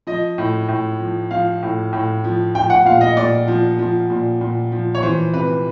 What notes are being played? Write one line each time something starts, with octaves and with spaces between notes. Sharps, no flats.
F3 D#5
A2
A2
F3
F3 F5
A2
A2
F3
F3 G5
F#5
A#2 F5
D#5
A#2 D5
F3
F3
A#2
A#2
F3
C#5
E3 C5
C3 B4